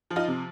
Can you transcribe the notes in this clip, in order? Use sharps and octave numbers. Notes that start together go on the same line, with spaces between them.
F3
D#4 F4
C3